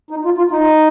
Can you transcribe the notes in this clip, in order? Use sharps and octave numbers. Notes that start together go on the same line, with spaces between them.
D#4
F4
F4
D#4